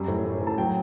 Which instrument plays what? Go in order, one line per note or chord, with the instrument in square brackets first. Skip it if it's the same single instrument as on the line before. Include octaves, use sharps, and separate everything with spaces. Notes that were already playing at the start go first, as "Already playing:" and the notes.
Already playing: [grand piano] F#2 G3
A2
A2
A2
A5
F#3 G5